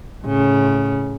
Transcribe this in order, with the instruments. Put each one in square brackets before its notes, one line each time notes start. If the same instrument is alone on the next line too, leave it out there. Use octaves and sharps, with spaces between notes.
[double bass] A2 C#3